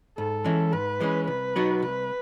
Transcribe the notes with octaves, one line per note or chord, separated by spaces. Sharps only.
G#2 A4
E3 G#3 C#4
G#2 B4
E3 G#3 C#4
C2 B4
B2 F#3 B3 D#4
C2 B4